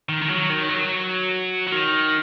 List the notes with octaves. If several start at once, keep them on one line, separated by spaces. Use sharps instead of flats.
D#3
D#3
F#3
D#3
F#3
F#3
D#3